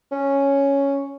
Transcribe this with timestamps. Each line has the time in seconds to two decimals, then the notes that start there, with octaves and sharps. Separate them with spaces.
0.12 C#4